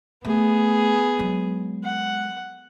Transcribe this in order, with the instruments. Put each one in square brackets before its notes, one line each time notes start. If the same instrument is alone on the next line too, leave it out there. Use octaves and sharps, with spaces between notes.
[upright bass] A3 [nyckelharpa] B3 G#4
[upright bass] F#3 G#3
[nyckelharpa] F#5